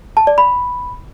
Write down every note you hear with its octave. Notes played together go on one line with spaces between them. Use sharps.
A5
D5
B5